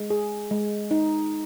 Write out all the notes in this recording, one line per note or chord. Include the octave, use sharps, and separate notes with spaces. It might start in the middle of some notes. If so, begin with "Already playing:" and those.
Already playing: G#3
G#4
G#3
D#4